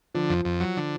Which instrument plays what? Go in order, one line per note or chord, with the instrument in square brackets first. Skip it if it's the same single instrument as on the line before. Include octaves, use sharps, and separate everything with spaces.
[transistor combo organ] D3 [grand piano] F3
[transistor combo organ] F2
F2
F#3
D3